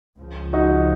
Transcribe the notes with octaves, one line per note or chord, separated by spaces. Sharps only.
C#2 C#3 F3
D#4 F#4